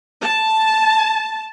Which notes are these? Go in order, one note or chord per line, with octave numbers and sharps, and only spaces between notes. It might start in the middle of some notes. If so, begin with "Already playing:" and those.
A5